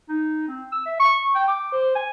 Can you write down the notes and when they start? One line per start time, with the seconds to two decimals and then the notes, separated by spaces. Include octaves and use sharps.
0.09 D#4
0.48 C4
0.72 E6
0.86 E5
1.00 C#6
1.35 G5
1.48 D6
1.72 C5
1.95 G#5